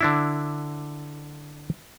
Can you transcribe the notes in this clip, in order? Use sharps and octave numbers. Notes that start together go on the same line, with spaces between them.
D3 D4 E4